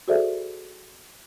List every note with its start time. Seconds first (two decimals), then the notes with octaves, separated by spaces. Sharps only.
0.08 F#4 G#4 A4 C5 D5 E5